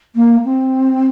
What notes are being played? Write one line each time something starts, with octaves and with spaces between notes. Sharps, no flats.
A#3
C4